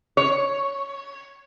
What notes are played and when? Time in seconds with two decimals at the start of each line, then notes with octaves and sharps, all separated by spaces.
0.17 C#5